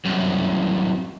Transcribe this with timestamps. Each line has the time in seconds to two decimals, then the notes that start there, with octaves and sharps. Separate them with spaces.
0.05 C2 F#2